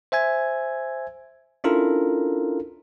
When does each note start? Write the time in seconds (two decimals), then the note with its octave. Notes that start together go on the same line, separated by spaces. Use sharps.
0.12 C5 E5 G#5 G#6
1.64 C#4 D4 E4 F4 A4 A#4